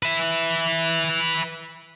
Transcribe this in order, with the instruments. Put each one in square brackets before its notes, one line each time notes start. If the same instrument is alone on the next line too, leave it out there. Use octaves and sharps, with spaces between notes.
[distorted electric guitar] B4 E5